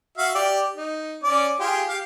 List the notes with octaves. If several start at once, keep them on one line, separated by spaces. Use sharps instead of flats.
F#4 E5 F5
G4 D5
D#4
C#4 D5 D6
F4 G4 G#4
G4 F5